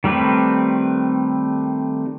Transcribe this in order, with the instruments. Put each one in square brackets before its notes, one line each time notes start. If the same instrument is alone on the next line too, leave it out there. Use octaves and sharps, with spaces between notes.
[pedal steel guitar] D#3 G3 A3 C4 B4